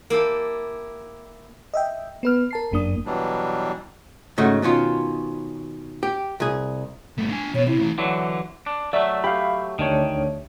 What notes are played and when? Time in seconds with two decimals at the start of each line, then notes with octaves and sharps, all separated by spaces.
0.10 A#3 E4 G4 A5
1.74 D#5 E5 G5
2.23 B3 B4 F6
2.51 A#4 A5 C7
2.71 G1 F#2 A#3 D4 D#6
3.06 B2 E3 F#3 G3 D4
4.38 G#2 C#3 A3 F#4
4.62 B2 D#3 C#4 F4
6.03 G4
6.40 C2 G#4
7.18 G2 A3
7.31 D4 G#5
7.55 B2 B3 C#5
7.68 C3 E4
7.79 A2 E3
7.98 D3 E3 F#3
8.66 D4
8.93 F#3 A3 D5 E5 E6
9.24 G4 F5 B5
9.79 D2 D#3 D4 C#5